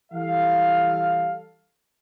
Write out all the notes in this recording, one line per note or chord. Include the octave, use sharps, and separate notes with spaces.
E3 G3 A4 F5